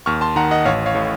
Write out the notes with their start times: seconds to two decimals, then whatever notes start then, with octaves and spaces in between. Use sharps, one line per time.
0.06 D#2 C#6 F6
0.21 A5 C6
0.36 D#3 F#5 A#5
0.51 D#5 F#5
0.65 A1 C#5 F5
0.86 C#5 F5
0.95 A2